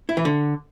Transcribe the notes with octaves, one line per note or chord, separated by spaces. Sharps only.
E4
E3
D3